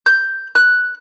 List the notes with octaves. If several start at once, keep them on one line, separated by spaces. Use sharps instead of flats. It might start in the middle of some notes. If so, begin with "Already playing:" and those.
G6
F#6